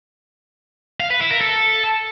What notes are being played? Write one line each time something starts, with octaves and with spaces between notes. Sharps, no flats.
F5
B4
E4
A#4
A4